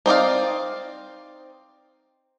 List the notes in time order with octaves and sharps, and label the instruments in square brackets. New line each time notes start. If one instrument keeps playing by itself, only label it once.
[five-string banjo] C4 D#4 D5 F5